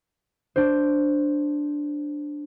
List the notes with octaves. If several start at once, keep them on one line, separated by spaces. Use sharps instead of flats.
D4 C5